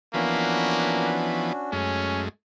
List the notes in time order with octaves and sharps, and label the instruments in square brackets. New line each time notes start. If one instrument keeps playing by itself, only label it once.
[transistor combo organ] E3 F3 B3 [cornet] A#3 [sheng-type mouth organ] C#4 D4 F#4
[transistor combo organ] F#2 G#3 A3 [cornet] C#4